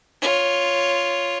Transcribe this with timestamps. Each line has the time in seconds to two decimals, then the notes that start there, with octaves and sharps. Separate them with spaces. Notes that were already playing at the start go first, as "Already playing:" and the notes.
0.22 F4 C#5